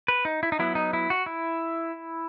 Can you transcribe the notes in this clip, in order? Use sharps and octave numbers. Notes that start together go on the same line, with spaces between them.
B4
D#4
E4
D#4
F#3 B3 E4
D#4
E4
F#4
E4